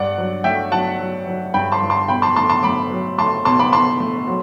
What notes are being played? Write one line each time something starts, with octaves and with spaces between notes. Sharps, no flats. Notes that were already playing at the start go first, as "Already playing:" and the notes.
Already playing: G2 D5 F#5
F#3
A3 E5 G5
F#3 F#5 A5
F#3
F#3
G2 G5 B5
A5 C6
G2
A5 C6
B2 G5 B5
A5 C6
A3 A5 C6
A5 C6
A3 B5 D6
F#3
A3 A5 C6
B2 A5 C6
B5 D6
B2 A5 C6
A3
F#3